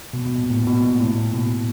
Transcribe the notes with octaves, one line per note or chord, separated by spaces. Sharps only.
B2
B2
A#2
A2
B2
A#2
A2
A#2
B2